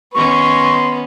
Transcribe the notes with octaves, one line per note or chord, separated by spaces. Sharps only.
D#3 B3 C#4 C6 C#6